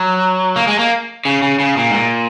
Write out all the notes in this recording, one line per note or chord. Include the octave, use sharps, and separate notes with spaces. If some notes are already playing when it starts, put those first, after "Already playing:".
Already playing: F#3
A#3
G#3
A#3
C#3
C#3
C#3
A#2
G#2
A#2